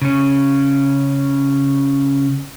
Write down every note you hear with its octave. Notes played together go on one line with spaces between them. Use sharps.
C#3 C#4